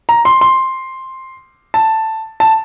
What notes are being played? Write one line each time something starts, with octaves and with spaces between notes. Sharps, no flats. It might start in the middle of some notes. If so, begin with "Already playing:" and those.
A#5
C6
C6
A5
A5